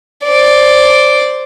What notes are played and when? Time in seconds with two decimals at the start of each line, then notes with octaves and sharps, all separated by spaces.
0.24 C5 D5